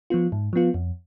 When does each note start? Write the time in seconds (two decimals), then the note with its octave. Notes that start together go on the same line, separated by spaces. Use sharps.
0.10 F3 B3 F4
0.32 G#2
0.53 F3 B3 F4
0.74 F2